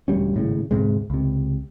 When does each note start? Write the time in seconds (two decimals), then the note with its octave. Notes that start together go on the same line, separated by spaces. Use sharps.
0.08 E1 D2 G3 C#4
0.34 G#1 A2 C#3
0.71 D2 G#2 C3 G#3
1.10 C#2 C3